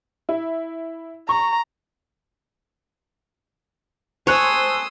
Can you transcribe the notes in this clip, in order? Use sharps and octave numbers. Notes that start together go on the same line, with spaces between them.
E4
A#5 C#6
C5 C#5 G#5 A5 C6 D#6 E6 F#6